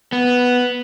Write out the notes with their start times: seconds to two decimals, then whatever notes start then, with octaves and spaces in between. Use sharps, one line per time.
0.12 B3